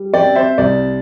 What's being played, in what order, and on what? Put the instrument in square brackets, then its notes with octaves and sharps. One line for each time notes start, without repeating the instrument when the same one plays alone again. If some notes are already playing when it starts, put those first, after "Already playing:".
Already playing: [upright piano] G3
D5 G5
C4
C5 E5
C2 D5